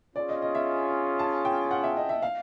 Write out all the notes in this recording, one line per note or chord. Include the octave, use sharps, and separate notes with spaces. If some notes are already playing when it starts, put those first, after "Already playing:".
C#4 F4 G#4 D5
D#5
D#5
E5
A5
G5
F#5
E5
D#5
E5
F5